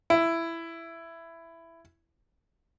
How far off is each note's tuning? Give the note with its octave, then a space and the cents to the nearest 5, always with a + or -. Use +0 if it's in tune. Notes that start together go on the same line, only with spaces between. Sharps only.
E4 +10